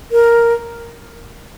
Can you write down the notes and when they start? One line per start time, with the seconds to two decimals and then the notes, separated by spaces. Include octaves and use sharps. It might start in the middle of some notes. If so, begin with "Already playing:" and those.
0.12 A#4